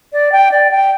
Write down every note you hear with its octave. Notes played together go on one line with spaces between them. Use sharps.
D5
G5
D5
G5